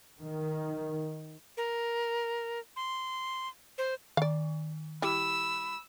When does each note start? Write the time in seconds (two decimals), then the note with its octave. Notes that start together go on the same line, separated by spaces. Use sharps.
0.20 D#3
1.57 A#4
2.76 C6
3.78 C5
4.17 D#3 D5 F5
5.02 G3 E4 B5 E6